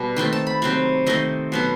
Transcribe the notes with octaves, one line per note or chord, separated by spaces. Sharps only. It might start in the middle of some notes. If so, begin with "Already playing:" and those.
Already playing: B2 G3
D#3 A3 C4 G5
A5
B5
C3 F#3 C4 B5
D#3 A3 C4 D#5
B2 F#3 B3